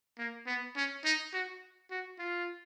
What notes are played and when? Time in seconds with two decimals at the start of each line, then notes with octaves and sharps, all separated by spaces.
0.18 A#3
0.47 B3
0.76 C#4
1.05 D#4
1.33 F#4
1.91 F#4
2.19 F4